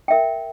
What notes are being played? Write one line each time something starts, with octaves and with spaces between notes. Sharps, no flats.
A#4 E5 G5